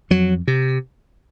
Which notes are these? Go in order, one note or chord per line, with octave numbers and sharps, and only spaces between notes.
F2 F#3
C3